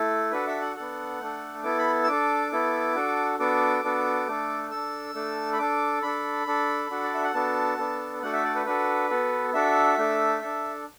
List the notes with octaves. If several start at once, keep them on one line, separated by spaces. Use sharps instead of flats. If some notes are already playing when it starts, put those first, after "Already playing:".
Already playing: A3 E4 A4
D4 F#4 A4 B4
E5
F#5
B3 D4 A4 F#5
A3 D4 A4
B3 E4 A4 D6
B5
E6
D4 A4 D6
B3 E4 A4
D4 F#4 A4
B3 D4 F#4 A4 D6
B3 D4 F#4 A4
A3 D4 A4
D4 A4 E6
A3 D4 A4
B5
D4 A4 D6
D4 A4 B5
D4 A4
D4 F#4 A4
D5
E5
F#5
B3 D4 F#4 A4 A5
B3 D4 A4
A3 D4 F#4 A4 F#5
E5
D5
B4
D4 F#4 A4 B4
B3 F#4 A4
D4 F#4 A4 E5
A3 D4 A4
D4 A4